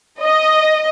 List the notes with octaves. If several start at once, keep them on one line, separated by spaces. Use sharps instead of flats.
D#5